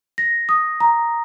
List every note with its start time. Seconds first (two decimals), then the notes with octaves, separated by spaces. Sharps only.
0.18 A#6
0.49 D#6
0.80 A#5